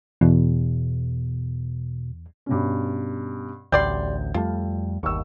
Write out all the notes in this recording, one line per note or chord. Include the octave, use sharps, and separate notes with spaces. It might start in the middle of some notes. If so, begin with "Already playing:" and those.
E2 B2
G2 B2 C#4
A1 D2 G3 D5 C6 G6
F2 G3 A3 F4
G1 D#2 C#6 E6